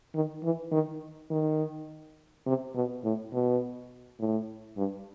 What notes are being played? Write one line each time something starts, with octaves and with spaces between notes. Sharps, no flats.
D#3
E3
D#3
D#3
C3
B2
A2
B2
A2
G2